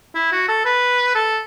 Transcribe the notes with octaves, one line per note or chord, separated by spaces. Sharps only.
E4
F#4
A4
B4
A4